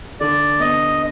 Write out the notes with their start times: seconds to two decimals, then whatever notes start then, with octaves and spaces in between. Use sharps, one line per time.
0.20 D3 D5
0.60 B3 D#5